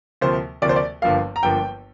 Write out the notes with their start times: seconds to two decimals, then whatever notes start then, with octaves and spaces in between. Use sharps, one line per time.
0.21 D2 C3 F3 A#3 C5
0.62 D2 C3 F3 A#3 D5
0.69 C5
0.76 D5
1.02 G1 G2 F3 A#3 F5
1.36 A#5
1.43 G1 G2 F3 A#3 G5